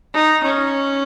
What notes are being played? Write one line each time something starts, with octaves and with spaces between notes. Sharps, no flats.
D#4
C#4